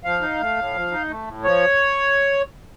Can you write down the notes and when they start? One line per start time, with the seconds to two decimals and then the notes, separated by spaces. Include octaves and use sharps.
0.04 F3 F5
0.21 D#4
0.39 A3
0.56 A2
0.74 F3
0.91 D#4
1.09 A3
1.27 A2
1.44 F3 C#5